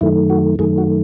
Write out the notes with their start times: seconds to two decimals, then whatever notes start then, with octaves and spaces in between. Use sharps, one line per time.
0.01 F#2 D#3 A3 E4
0.30 F#4
0.59 F#2 D#3 A3 G#4
0.78 F#4